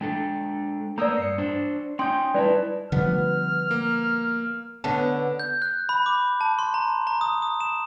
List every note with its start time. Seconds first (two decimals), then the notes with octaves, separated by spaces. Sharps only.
0.01 G#3 D4 A4 G5
0.98 A#3 B3 A#4 D5 A#5 D#6 E6 G6
1.18 G2 C7 C#7
1.38 D4 C5
1.99 C#4 D#4 G5 C6 D#6 G6
2.34 G3 D#4 E4 B4 D5 A5
2.92 D3 F3 G3 B3 F6
3.71 A#3
4.84 D3 B3 C#4 A5
5.39 G6
5.62 F#6
5.89 B5
6.06 D6
6.41 A5
6.59 C6
6.74 A#5
7.07 A#5
7.21 D#6
7.42 D#6
7.60 E7